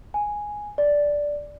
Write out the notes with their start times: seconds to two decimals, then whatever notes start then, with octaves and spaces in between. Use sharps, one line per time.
0.14 G#5
0.78 D5